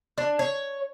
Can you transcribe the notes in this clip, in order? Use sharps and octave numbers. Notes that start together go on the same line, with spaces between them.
D4
C#5